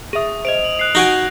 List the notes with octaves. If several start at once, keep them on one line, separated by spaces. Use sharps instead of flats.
G#4 E5 D#6 D#7
C5 D#5 D7 F7
F#7
F#6 C7 F7
D#4 F#4 G#5 A#6 C7 D7